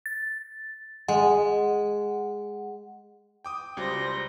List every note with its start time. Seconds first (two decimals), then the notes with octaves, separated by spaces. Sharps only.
0.06 A6
1.08 G#3 F#5
3.44 G5 D6 D#6
3.77 C#2 G3 F#4 C5 C6 D6 G6 A#6